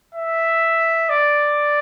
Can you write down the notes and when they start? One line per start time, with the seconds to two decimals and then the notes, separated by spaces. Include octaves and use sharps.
0.15 E5
1.09 D5